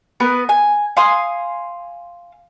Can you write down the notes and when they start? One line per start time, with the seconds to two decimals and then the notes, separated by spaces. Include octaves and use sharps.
0.20 B3 A#4 B4
0.49 G#5
0.97 F5 G#5 C6 D#6